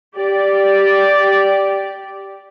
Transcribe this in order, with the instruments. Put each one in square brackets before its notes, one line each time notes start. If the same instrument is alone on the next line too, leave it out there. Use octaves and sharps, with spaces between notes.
[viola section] G4 D5